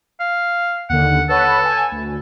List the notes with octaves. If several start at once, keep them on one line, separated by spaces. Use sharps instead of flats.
F5
D#2 D3 F#5
A4 B4 C#5 F#5
G#5
D2